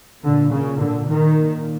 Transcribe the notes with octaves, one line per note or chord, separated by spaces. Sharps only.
A#2 D3
C#3
D3
D#3
A#2